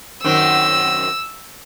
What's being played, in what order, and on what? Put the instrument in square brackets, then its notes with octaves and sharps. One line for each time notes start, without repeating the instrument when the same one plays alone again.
[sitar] F#2 D#3 C4 [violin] E6